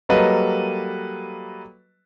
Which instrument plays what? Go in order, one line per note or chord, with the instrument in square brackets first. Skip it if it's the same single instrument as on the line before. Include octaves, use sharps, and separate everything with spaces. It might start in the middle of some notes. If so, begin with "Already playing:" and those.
[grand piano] F#3 G3 A#3 A4 B4 D#5